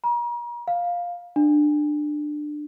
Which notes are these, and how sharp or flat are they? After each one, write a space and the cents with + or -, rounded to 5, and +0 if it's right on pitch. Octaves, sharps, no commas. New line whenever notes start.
A#5 +40
F5 +5
D4 +20